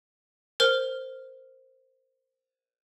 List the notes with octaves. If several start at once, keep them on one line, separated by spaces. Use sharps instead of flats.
A#4 C5 F6